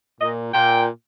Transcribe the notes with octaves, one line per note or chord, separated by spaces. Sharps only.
A#2 D#5
A#2 G5